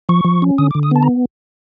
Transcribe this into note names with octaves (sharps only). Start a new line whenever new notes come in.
F3 C#6
F3
C#4
D3 D#6
D6
D3
D#6
B3 A5
A#5